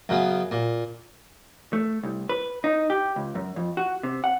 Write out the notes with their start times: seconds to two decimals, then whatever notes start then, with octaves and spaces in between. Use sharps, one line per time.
0.09 F#2 C#3 B3
0.51 A#2
1.73 A3
2.03 C2
2.29 B4
2.64 D#4
2.90 G4
3.16 C#2
3.35 F#2
3.56 F2
3.77 F#4
4.03 C3
4.24 F#5